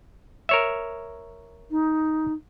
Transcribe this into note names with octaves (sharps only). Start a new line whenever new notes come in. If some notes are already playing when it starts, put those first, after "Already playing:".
A#4 C#5 E5
D#4